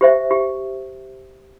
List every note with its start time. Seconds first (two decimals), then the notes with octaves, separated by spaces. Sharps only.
0.01 G4 C5 E5
0.31 G4